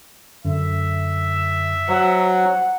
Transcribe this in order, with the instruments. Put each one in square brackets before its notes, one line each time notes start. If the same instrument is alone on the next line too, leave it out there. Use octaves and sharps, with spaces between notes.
[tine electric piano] F#2 D3 [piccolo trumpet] E5
[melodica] F#3 [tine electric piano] C5 [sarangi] F#5